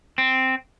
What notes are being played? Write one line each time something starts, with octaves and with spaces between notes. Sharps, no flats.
C4